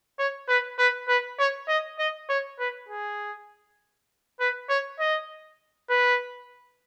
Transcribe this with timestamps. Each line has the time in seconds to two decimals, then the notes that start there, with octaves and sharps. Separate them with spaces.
0.18 C#5
0.48 B4
0.78 B4
1.08 B4
1.39 C#5
1.68 D#5
1.99 D#5
2.29 C#5
2.59 B4
2.88 G#4
4.40 B4
4.69 C#5
4.99 D#5
5.90 B4